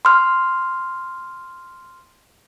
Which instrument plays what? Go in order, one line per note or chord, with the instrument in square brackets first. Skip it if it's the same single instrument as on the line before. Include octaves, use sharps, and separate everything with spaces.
[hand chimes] C6 F6